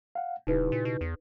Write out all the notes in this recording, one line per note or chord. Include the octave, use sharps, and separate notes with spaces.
F5 F#5
D#1 C#3 D#4 E4 G4 B4
A#2
B2
E2